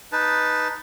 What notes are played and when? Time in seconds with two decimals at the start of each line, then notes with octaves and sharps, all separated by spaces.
0.12 D#4 B4 A5